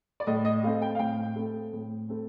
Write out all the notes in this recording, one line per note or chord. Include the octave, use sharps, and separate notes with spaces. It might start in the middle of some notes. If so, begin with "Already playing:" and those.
D5
A2 D#5
D#5
A3 C4 F5
G5
F5
A2 G5
A3 C4
A2
A3 C4